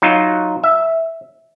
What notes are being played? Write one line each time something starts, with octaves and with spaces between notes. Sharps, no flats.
F#3 D#4 F4
E5